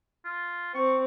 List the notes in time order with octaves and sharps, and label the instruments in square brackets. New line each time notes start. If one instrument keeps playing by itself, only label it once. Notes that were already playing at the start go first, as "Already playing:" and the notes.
[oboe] F4
[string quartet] C4 [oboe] C#6